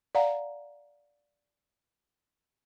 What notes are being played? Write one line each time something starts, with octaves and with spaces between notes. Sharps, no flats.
D5 F5 F#5 A#5